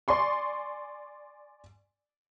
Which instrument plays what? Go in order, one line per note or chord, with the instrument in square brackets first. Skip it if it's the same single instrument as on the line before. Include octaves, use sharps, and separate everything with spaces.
[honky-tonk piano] D5 G#5 C6 C#6